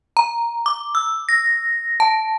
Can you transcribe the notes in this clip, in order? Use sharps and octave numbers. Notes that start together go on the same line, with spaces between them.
A#5
D6
E6
A#6
A5